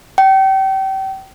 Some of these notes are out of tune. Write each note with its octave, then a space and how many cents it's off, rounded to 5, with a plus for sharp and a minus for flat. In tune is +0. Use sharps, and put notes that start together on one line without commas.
G5 -30